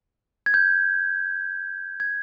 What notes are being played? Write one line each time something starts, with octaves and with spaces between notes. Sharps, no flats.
G#6
G6
G#6